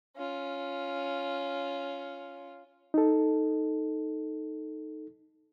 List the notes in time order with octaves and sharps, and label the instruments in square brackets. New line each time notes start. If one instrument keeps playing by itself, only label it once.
[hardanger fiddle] C#4 F4
[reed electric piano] D#4 A4